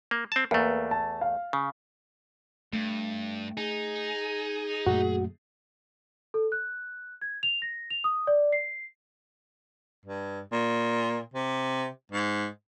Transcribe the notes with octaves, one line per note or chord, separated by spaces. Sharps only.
A#3
C4 A5
E2 A3 A#3 B4
A5
F5
C#3
G2 A3
D#4 G#4
F#2 A#2 A3 F#4
A4
F#6
G#6
F7
A#6
F7
D#6
D5
C7
G2
A#2
C3
G#2